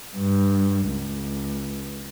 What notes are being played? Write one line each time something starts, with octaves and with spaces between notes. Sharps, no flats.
G2
C#2